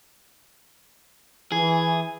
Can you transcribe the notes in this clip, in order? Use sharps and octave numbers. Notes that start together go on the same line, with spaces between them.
E3 G#4